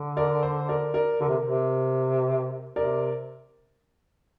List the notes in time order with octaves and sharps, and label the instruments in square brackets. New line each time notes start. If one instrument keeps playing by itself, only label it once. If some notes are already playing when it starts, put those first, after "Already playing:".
Already playing: [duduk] D3
[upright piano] A#4 D5
C5
A#4 D5
A#4 D5
[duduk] D3 [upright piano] A#4
[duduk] C3
C3
[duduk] C3 [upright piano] A#4 D5